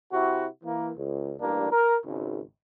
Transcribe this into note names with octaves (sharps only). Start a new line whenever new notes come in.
C3 E4 F#4
E3 A#3
C#2
A1 G2 A#3 D4
A#4
G#1 C#2